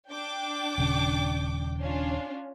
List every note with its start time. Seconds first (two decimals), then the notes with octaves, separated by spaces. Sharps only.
0.10 D4 G5 D6
0.78 D#1 C#3
1.79 C#4 D4 F4